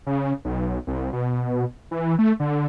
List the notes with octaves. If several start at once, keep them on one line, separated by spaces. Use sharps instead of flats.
C#3
B1
C2
B2
E3
A3
D3